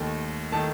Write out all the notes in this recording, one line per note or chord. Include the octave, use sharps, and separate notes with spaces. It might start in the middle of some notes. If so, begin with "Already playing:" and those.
Already playing: D#2 D#3 A3
D#3 A3 A5